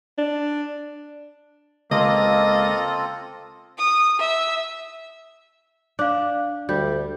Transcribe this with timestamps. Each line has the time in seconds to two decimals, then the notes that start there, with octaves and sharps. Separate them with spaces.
0.18 D4
1.91 C#2 A#3 C4 F4 A4 D#5
3.78 D#6
4.20 E5
5.99 D4 D5 F5
6.69 D2 G3 G6